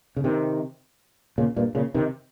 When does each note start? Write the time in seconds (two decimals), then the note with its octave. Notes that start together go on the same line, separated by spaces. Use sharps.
0.16 C#3
0.24 C3 D#3
1.38 A#2 C#3
1.56 G2 A#2
1.75 A#2 C#3
1.94 C3 D#3